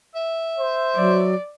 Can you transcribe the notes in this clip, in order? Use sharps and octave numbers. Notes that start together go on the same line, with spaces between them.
E5
C5
F#3 D5